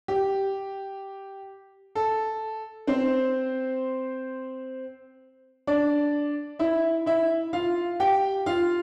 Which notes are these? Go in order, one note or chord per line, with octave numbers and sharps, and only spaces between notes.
G4
A4
C4 C5
D4 D5
E4 E5
E4 E5
F4 F5
G4 G5
F4 F5